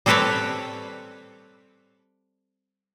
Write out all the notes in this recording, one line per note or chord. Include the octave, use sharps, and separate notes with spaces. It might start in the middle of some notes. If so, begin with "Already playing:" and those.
G3 C4 A4 B4 C#5 D5